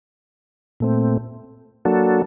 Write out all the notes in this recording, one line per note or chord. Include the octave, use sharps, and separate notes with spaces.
A#2 A3 C4
F#3 A#3 D4 F#4 A4